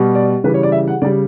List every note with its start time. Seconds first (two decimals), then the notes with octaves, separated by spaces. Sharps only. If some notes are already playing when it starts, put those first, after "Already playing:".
Already playing: B2 G3
0.15 D5
0.44 C#3 E3 G3 B4
0.54 C#5
0.63 D5
0.72 E5
0.88 F#5
1.02 C#3 G3 D5